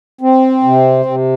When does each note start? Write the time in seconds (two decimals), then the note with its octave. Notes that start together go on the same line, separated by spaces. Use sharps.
0.21 C4
0.63 C3
1.06 C3